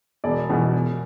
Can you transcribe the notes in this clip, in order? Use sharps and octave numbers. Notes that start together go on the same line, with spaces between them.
E1 D5
E2 B2
E1